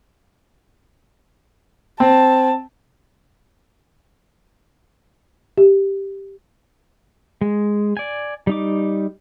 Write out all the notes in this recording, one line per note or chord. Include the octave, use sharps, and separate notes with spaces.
C4 A5
G4
G#3
D5 G#5
G3 D#4 D6